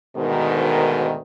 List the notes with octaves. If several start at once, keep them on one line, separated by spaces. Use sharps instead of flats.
D2 G#2 B2 D#3